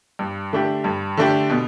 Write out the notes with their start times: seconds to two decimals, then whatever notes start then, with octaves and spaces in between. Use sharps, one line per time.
0.19 G2
0.53 D3 A3 D4 G4
0.84 G2
1.17 D3 A3 D4 G4
1.50 B2